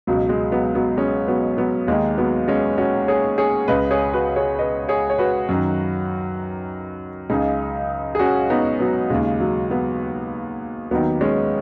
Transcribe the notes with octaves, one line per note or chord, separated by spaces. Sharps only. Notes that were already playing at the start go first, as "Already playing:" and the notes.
C#2 B2 F#3
G#3
F#3 B3
F#3 B3
G#3 C#4
F#3 B3
F#3 B3
D#2 D#3 G#3
F#3 B3
G#3 C#4
C#4 F#4
G#4 C#5
G#4 C#5
C#2 C#3 B4 D#5
G#4 C#5
F#4 B4
G#4 C#5
B4 D#5
G#4 C#5
C#5
F#4 B4
F#2 D#3
C#2 C#3 D#4 G#4
G#4
C#4 F#4
B3 D#4
F#3 B3
D#2 C#3 G#3
F#3
F#3 B3
D#2 D#3 F#3 B3
G#3 C#4